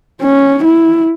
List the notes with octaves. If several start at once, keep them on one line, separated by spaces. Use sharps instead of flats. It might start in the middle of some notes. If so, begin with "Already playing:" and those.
C#4
E4